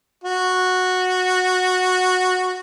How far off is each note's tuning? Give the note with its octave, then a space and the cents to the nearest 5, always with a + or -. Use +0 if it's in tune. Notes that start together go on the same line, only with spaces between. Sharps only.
F#4 -10